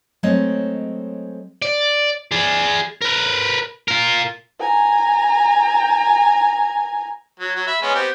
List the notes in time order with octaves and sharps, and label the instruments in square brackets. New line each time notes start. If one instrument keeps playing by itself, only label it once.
[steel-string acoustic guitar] F#3 G#3 A3 C4 C#5 D#5
[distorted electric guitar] D5
G#4 D5
A#4 B4
F4 A#4
[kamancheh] G#5 A#5
[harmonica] F#3
F#3
E5 B5
G#3 B3 C#4
B3 C4 G4